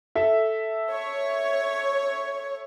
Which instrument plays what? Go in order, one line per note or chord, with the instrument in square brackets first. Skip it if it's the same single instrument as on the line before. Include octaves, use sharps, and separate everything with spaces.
[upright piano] A4 E5
[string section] C#5